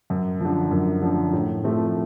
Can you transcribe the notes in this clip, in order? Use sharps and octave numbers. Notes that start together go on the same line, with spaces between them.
F#2
D3 F3
F#2
D3 F3
A2
F3 A3 C4